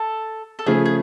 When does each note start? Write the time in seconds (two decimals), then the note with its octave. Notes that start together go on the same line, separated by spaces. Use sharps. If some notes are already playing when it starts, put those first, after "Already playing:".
Already playing: A4
0.59 A4
0.67 C#3 F3 A3 G#4
0.86 G#4